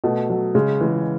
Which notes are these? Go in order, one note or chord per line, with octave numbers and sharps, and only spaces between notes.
B2 A3
F#3
C#3 G#3
E3 G#3